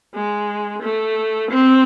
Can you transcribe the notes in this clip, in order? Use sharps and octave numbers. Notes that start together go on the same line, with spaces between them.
G#3
A3
C4